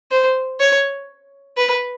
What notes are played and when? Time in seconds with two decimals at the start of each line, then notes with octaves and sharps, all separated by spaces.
0.11 C5
0.60 C#5
1.57 B4